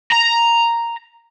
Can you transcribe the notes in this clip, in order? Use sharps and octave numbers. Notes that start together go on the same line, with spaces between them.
A#5